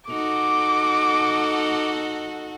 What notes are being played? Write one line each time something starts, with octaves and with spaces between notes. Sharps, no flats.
D#4 F#4 A4 D6